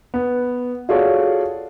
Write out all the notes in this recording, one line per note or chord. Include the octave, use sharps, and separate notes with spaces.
B3
F4 F#4 G#4 A4 C#5 D5